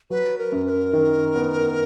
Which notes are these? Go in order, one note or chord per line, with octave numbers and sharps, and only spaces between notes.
F#3 B4
A#4
F#2
B4
A#4
D#3
B3